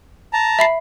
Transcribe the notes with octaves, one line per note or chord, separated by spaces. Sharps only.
A5 A#5
E5 B5 C7